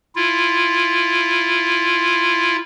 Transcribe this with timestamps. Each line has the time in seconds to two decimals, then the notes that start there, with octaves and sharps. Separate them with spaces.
0.16 E4 F4